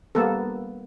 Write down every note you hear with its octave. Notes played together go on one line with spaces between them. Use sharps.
G3 A#3 B3 A4